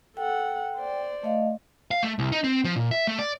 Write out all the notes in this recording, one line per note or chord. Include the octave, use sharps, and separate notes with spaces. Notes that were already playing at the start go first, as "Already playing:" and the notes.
A4 F#5 G5
C5 D5
A3 D#5 F5
F5
A3
C2
D#4
C4
F3
A#2
E5
A3
D5